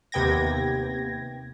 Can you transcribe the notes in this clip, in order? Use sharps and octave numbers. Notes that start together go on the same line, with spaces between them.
D#2 C3 B3 G5 G#6 A#6